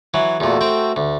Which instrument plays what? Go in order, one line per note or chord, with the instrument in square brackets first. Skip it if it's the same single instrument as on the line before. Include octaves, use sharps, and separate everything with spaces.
[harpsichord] E3 F#3
[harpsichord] E2 A#2 [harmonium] A3 F#4 A4
[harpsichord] C4 G5
D2